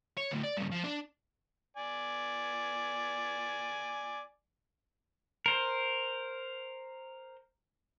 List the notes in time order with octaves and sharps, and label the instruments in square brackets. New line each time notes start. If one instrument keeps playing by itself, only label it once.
[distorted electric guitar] C#5
D2 A2
D5
G2 C#3
F3
D4
[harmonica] D5 G#5
[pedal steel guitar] A#4 C5